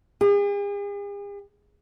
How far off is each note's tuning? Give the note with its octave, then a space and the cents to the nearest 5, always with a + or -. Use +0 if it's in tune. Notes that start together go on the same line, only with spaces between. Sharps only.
G#4 -45